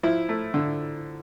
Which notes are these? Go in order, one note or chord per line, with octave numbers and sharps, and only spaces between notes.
F3 E4
A3
D3